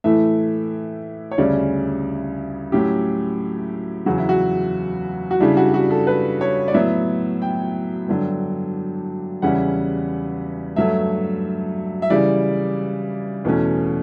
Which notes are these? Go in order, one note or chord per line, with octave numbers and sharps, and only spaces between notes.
A2 E3 A3 E5
C#5
D2 C#3 G3 C#4 D5
A2 F#3 C#4 E4 G4
E2 C#3 F#3 F#4
E4
F#4
F#4
C#3 G3 D4 E4
F#4
F#4
A4
B4
C#5
D5
A2 F#3 B3 E5
G5
G2 D3 F#3
E2 C#3 G3 C#4 E4 F#5
G2 F#3 A3 E5
E5
C#3 E3 G3 D5
E2 B2 A3 C#4